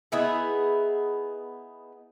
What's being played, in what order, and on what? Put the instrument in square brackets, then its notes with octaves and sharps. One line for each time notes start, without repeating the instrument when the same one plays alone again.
[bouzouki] B3 D#4 E4 G#4